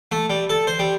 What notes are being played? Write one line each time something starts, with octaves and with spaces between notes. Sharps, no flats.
A3
G3
A4
C5
G3